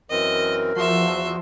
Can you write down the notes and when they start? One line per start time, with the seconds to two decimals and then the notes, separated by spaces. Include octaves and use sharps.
0.11 F#2 E3 C4 A#4 D#5
0.76 E2 F3 F#4 E5 C6